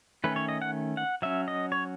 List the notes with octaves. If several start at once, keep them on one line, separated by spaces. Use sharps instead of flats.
D#3 A3 C#4 B4
C#5
D#5
F#5
F#5
F#3 C#4 E5
D#5
C#5